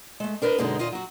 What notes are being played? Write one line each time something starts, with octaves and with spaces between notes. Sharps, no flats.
G#3 A3
D4 A#4 B4 D#5
F#2 B2 D3 G#3 B3 D#4
D#2 A#2 F4 D#5
F#3 F#4